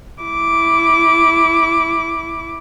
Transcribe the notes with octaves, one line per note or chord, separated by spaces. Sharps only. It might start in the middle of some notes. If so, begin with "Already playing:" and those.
E4 D6